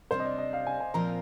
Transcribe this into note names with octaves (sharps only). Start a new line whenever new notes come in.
C3 G3 D4 C5
D#5
D5
D#5
F5
G#5
G#5
A#2 F3 C4 F4 A#4 A#5